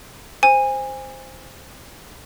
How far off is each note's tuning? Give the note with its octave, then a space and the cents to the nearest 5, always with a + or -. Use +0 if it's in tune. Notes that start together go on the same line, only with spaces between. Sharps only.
C5 +0 G#5 -25